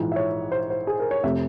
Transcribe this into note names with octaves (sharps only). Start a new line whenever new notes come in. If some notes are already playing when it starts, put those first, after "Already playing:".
Already playing: A#1 G#2 E3
E5
C#5
C5
C5
G#4
A#4
C#5
F1 C3 E5